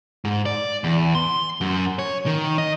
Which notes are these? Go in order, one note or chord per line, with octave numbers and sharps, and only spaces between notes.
G#2
D5
E2
C6
F#2
C#5
D#3
D#5